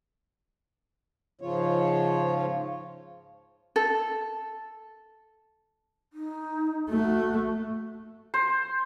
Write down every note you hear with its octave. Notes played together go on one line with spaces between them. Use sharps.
G#2 C#3 F3 F4 C#5
A4
D#4
A3 F#4
C5